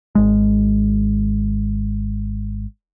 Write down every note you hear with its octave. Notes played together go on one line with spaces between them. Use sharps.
G#1 G#3